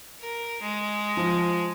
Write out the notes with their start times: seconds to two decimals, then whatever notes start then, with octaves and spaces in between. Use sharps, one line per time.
0.19 A#4
0.62 G#3
1.17 F3